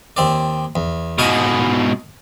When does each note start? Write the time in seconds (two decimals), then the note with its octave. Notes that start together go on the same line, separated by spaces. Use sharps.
0.17 D#2 C4 D5
0.76 E2
1.19 G#2 B2 D#5 F5 C#6